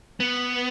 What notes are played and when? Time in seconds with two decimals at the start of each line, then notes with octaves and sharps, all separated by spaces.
0.20 B3